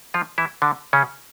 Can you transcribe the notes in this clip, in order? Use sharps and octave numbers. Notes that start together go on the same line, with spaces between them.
F3 F4
E3 E4
D3 D4
C#3 C#4